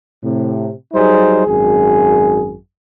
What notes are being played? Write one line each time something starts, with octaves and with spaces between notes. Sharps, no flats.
A2 C3
F#3 G3 D#4 G#4 C5
G#1 F#2 G#4